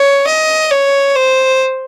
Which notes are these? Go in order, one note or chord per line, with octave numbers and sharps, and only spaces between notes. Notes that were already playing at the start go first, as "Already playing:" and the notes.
Already playing: C#5
D#5
C#5
C5